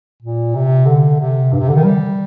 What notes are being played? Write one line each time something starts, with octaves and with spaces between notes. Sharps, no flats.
A#2
C3
D3
C3
G2
C3
D3
D#3
G3